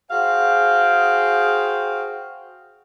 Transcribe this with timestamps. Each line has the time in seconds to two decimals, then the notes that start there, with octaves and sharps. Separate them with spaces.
0.11 F#4 G#4 C5 F5 G5